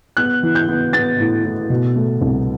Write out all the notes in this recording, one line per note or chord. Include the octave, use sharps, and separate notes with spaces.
B3 F#6
E3
G6
B3
B3 A6
A2
A2
B2
A3
C2